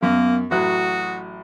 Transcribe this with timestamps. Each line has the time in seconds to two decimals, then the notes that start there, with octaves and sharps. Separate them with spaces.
0.03 F#2 A#3 B3
0.51 A1 F#3 F#4 D#6 F#6